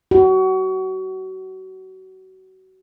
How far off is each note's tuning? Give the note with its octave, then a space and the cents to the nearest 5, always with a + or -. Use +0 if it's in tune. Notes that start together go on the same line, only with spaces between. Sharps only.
F#4 +30